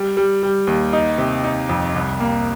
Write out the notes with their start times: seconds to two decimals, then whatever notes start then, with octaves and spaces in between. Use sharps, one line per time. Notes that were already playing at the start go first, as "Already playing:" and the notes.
Already playing: G3
0.17 G3
0.43 G3
0.67 D#2
0.93 D#4
1.18 C3
1.44 D#4
1.69 F2
1.95 C2
2.20 A#3